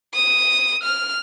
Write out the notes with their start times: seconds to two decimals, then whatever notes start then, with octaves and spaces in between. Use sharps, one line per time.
0.15 D#6
0.84 F6